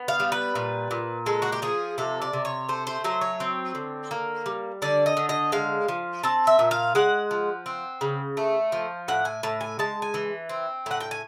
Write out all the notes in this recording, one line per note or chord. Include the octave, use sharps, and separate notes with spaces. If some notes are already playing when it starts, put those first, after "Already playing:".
Already playing: B3
F5
G3
B4
A#2
A#2
G#3 A4
F#4
G4
F3 G#4
C3 A4
D5
C3
C#5
A3 C5
C5
F#3 C5
C#5
C4
D3
A#3
G3
D3 D5
D#5
D3
D#5
G#3 F5
F3
C4 A5
E5
A#2
F5
G#3 F#5
F3
C4
C#3
A3
F3
A2 F#5
G#5
A2 A5
G#5
G#3 A5
G#5
E3
C4
A2 F#5
G5
G#5